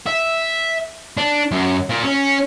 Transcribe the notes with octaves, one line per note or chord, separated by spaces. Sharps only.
E5
D4
F#2
A#2
C#4